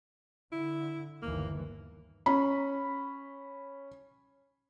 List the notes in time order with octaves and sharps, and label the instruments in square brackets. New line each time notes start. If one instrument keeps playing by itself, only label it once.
[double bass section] D3 [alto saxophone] E4
[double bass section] G1 D#2 E3 [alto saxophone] A#3
[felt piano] C#4 B5